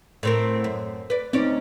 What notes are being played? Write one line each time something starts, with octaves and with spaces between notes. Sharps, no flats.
A2 C4 A#4
F#2
B4 D5
D2 C4 C#4 D#4 D5